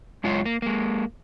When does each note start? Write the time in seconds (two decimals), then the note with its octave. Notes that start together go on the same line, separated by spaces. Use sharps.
0.24 F#2 G#3 F4 C#5
0.45 A#3
0.62 G#3 A#3